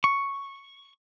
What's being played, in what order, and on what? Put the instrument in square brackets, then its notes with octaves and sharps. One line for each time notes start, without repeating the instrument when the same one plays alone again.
[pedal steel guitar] C#6